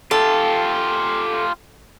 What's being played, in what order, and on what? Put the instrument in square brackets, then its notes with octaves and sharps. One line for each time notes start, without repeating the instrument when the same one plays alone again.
[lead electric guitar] F4 G4 [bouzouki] A4